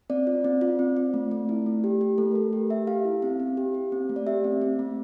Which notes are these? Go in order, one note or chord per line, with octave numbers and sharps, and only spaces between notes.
C4 D5
F4
C4
F4
C4
C4
A3
A3
E4
A3
G4
G4
A3 A4
A3 A#4
G4
G4 E5
G4 F5
E4
C4 F5
C4
G4
G4
C4
A3
D5
G4 E5
C4
C4
A3